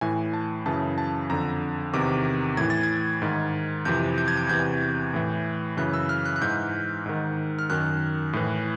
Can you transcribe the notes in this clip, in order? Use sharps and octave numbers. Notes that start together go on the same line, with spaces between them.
A2 E3 G#5
A5
F#2 C#3 E3 A5
A5
F2 D3 A#5
E2 C3 D#3 D6
A2 E3 G#6
A6
G#6
G#2 D#3
F2 C3 E3 G6
G6
G#6
G6
E2 C3 E3 G6
A2 E3
F#2 C#3 E3 F#6
E6
F6
F#6
F#6
G#2 E3 G6
G#2 D#3
F6
F#2 D#3 F#6
A2 E3